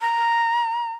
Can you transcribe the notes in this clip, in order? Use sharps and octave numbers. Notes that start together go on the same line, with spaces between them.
A#5